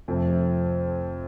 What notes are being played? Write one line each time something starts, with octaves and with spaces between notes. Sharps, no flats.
F2 C3 F3 A3